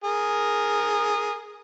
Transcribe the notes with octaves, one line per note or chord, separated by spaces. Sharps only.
G#4 A#4